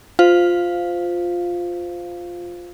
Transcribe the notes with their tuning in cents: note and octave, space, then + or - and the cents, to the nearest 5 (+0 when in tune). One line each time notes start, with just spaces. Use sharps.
F4 +10 C5 -15 F5 +0